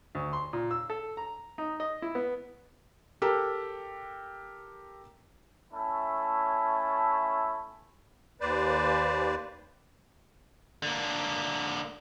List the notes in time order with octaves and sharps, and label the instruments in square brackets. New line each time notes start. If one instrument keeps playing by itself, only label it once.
[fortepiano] D2
C6
A#2
E6
A4
A#5
D#4
D#5
E4
B3
[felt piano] G4 A4 A#4
[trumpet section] A3 C#4 E4 A5
[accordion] D#2 B4 C5 D5
[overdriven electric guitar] D3 A#3